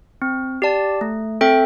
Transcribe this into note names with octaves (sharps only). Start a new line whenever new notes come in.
C4
G4 D5 A5
A3
C4 A4 E5 G5